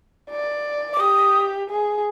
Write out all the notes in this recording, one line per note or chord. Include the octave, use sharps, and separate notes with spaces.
D5
D6
G4 D#6
G#4